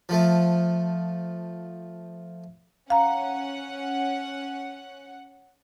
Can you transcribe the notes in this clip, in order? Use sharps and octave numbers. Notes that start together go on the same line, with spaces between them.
F3 A3
C#4 F5 F#5 A#5